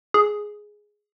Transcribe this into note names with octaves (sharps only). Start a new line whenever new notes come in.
G#4